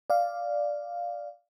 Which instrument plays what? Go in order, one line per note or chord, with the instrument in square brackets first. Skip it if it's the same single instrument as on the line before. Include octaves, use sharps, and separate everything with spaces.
[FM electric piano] D5 F5